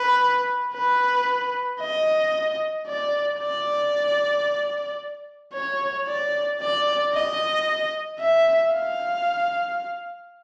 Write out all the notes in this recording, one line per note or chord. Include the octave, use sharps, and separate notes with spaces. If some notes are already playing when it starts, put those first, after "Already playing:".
Already playing: B4
B4
D#5
D5
D5
C#5
D5
D5
D#5
E5
F5